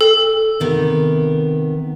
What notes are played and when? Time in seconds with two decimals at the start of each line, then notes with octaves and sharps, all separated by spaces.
0.01 A4
0.60 C3 D#3 B3